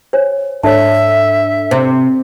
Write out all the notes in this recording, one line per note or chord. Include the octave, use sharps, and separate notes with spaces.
C5 C#5 G#5
G#2 D4 A4 C#5 E5 A5
C3 C5